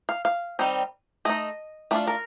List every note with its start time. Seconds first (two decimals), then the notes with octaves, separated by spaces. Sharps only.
0.09 F5
0.25 F5
0.59 D#3 G3 C4 D#4
1.25 A3 D#4 D#5
1.91 A3 D4 F4 D5
2.08 A#4